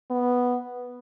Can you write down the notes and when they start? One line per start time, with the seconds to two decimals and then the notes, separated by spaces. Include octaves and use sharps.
0.10 B3